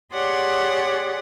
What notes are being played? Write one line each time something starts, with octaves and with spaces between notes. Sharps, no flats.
G4 G#4 C#5 D5 F#5 C6